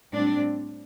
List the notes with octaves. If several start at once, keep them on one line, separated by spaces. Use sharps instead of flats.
A2 G3 C4 D4